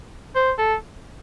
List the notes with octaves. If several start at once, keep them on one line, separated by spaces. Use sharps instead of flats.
C5
A4